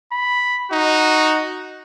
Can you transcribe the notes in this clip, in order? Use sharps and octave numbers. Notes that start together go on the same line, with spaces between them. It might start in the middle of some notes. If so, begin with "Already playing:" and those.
B5
D#4 F#4